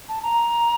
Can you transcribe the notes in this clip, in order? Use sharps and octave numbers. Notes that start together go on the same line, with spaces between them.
A5
A#5